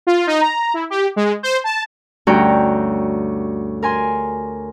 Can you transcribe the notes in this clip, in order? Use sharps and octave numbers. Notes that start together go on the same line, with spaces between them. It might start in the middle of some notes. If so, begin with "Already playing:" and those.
F4
D#4
A#5
E4
G4
G#3
C5
A5
D2 G2 C#4 F#4 G5 A#5
A#4 G#5 C6